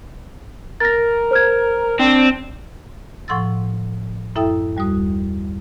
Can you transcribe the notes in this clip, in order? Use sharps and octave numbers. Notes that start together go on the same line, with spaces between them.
A#4 A6 A#6
C5 F6 G#6
C4 D4
A2 F3 F#5 C6 E6 A6
F#2 E4 A4 E5 G5 D#6
D#2 G3 F#4 D#6